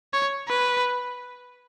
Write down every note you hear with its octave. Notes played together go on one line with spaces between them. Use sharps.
C#5
B4